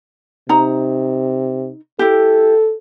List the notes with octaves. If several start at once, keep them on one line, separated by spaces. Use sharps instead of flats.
C3 D#4 A#5
E4 G4 A4